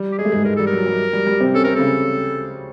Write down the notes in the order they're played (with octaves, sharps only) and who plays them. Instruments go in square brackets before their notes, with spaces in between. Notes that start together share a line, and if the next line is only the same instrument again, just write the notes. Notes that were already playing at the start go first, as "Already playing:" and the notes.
Already playing: [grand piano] G3
[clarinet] G4
[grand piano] G#3 [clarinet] G#4
[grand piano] A3
G#2 G#3
[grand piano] G#2 G#3 [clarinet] A#4
[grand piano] G3 [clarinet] A4
[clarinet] A#4
[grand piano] F#3
G3
G3
G3
C3 C4
[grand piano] C#4 [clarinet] A4
[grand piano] C4 [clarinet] A#4
[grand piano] C#3 C#4 [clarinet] A4